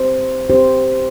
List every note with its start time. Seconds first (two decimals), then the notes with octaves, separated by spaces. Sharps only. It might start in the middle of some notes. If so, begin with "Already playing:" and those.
Already playing: C4 G4 C5
0.49 C4 G4 C5